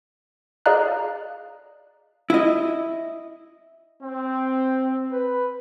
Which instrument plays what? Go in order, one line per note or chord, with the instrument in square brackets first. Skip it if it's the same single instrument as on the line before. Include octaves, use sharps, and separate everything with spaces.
[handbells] G#4 D5 D#5 F5 A#5 F#6
[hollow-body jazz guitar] E4 D#5
[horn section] C4
B4